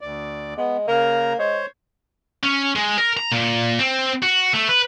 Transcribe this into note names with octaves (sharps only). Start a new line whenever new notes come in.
D2 D5
G#3 B3
C#3 A#3 A#4 A#5
G#3 C5 C#5
C#4
G#3
A#4
A#5
A#2
C4
F#4
A3
B4